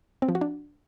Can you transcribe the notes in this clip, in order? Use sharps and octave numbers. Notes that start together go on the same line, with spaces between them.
C4
F3
F#4
D4